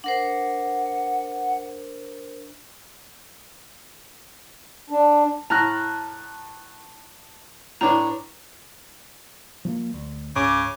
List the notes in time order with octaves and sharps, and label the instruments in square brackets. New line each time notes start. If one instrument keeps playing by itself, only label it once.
[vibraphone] D4 A#4 C5 [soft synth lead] F#5
[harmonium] D4
[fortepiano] A2 [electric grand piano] A5 F#6 [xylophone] A#5 F6 A#6
[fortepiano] A2 D4 [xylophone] B4 C#5 A#5
[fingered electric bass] F3 A3 A#3
D2
[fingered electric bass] C#2 G#2 [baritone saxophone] C#3 [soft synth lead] D6